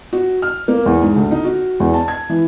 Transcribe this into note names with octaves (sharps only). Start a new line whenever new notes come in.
F#4
F6
A#3
E2
G#2
D2
D#4
F#4
E2
A5
G#6
E3